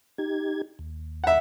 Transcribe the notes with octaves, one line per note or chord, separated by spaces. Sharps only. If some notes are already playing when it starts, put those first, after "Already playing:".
D#4 G4 G#6
D#2
E5 F#5